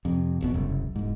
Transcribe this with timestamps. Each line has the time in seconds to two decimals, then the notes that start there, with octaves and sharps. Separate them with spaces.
0.05 F2 C3
0.41 F1 E2 B2
0.54 E1 C2 F#2 C#3
0.96 E1 G#2